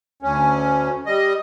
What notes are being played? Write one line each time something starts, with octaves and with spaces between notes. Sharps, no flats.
D2 C#4
G3 D#5